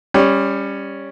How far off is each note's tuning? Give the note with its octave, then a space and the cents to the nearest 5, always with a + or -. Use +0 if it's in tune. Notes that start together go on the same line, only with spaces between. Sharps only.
G3 +15 C#4 +0